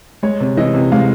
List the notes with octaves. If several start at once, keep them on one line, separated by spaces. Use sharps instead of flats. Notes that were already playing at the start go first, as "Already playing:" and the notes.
G#3 C#5
C3
E3 D#5
C3
G#3 F5